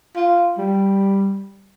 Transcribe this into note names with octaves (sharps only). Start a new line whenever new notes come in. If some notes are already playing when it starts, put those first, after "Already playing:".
F4
G3